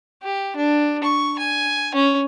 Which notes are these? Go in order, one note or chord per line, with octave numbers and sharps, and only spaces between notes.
G4
D4
C#6
G#5
C#4